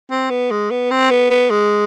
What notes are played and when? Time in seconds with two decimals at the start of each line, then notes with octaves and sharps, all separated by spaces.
0.11 C4
0.30 B3
0.51 G#3
0.71 B3
0.91 C4
1.11 B3
1.30 B3
1.50 G#3